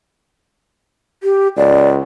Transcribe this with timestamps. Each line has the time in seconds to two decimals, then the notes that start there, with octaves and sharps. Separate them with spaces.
1.23 G4
1.57 C#2 D5